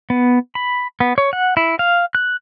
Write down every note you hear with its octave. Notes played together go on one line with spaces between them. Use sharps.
B3
B5
B3
C#5
F#5
E4
F5
F#6